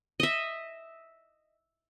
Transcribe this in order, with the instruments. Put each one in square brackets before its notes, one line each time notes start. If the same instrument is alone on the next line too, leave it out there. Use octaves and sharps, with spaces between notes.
[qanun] D#5 E5